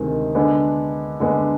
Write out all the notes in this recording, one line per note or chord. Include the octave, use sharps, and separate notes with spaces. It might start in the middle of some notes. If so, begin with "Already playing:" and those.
Already playing: D2 C3 D#3 G#3
D3 G#3 B3 D4
D3 G#3 B3 D4